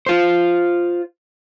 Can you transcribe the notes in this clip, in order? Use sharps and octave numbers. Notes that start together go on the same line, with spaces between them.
F4 C5